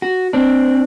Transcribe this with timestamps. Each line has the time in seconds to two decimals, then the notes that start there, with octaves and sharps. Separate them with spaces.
0.02 F#4
0.33 C4 D4